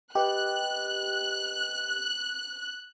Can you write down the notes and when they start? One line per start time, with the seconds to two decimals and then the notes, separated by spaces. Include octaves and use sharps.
0.15 G4 B4 D#5 F#6